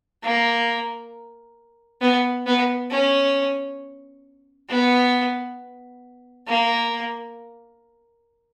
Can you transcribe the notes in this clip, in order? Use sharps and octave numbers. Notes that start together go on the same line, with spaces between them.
A#3
B3
B3
C#4
B3
A#3